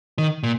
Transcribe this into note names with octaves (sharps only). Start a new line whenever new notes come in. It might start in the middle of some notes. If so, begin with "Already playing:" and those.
D#3
A#2